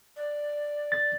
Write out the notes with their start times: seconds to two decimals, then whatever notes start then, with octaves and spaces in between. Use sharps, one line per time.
0.16 D5
0.92 A6